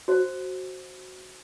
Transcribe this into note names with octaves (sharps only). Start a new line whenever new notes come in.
F#4 C5